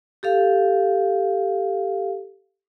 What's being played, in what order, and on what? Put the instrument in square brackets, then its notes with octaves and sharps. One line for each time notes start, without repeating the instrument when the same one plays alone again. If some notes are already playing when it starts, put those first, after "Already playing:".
[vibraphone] G4 A4 F5